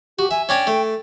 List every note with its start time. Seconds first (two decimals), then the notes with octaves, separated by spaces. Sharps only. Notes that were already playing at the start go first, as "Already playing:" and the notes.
0.19 F#4 G4
0.31 E5 G#5
0.49 C#4 D4 C#5 G5
0.67 A3